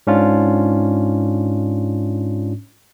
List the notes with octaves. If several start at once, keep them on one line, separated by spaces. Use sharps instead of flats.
G#2 C#4 D4 F4